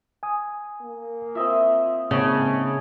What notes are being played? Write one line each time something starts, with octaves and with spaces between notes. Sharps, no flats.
G#5 D#6
A#3
C4 F4 D#5 E5
G#2 C#3 A#3 C4 C#5 A5